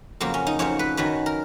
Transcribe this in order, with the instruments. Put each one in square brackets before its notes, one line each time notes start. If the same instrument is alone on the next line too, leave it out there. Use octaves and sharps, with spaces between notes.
[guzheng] F2 C#3 F#3 A#3
C#4
D#4
F2 C#3 F#3 C#5
B4
F#2 D#3 F#3 B4
A#4